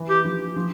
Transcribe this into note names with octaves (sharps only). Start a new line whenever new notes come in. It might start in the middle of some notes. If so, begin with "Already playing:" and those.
Already playing: E3
G4
F3
F3